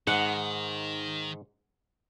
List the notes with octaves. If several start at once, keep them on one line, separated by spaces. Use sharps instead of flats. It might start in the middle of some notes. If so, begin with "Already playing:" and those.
G#2 D#3 F#5